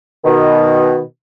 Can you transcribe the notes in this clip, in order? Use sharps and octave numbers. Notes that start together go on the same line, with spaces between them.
B2 D#3